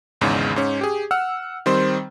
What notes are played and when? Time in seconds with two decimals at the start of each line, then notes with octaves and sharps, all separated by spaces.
0.21 G#1 E2 G#2 C#3
0.56 G#2 C#4
0.81 G4 G#4
1.11 F#5 E6 F6
1.66 D#3 G3 C4 C5